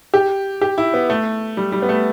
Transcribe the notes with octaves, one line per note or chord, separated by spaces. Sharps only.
G4
G4
E4
B3
A3
G3
G3
B3
A3